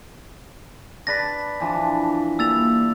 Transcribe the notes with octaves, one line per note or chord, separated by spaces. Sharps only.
B4 D5 A5 A#6 B6
E3 F3 D4
G3 A#3 E6 A6 F7